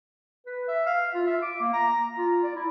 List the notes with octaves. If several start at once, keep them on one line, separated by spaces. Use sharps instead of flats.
B4
E5
F5
F4
E5
D6
A#3
A#5
F4
D5
E4